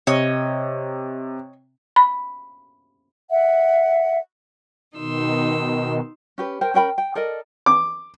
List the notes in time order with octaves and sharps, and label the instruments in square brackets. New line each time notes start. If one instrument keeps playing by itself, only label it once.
[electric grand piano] C3 [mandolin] C#5 D#5
[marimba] B5
[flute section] E5 F#5
[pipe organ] B2 D#3 [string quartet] D#4 C6 E6
[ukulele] C#4 G4 B4
A#4 C5 G5
C#4 A#4 G5 B5
G5
A4 A#4 D5 D#5
[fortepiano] D6